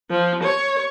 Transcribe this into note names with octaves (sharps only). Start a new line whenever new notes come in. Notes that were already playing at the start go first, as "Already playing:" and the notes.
F3
C#5